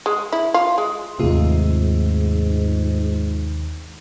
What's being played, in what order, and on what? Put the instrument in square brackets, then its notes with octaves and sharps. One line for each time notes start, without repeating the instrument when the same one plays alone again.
[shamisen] G#3
E4
F4
G#3
[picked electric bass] D#2 C3 [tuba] G#2 [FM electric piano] A3 F4 G#4